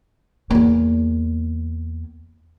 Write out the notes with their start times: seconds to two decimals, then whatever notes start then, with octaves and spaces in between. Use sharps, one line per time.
0.50 E2 A#3